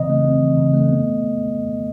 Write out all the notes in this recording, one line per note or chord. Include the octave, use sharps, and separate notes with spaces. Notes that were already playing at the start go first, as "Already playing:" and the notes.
Already playing: C#3 E3 C4 D#5
A3
C4
E3
C#3
A3
B3